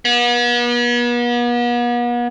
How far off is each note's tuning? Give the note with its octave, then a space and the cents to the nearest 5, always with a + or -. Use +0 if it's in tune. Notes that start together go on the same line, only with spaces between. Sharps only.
B3 -40